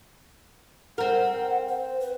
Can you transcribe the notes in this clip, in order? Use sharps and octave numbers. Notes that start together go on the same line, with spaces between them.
C4 A#4 F#5
C5
B4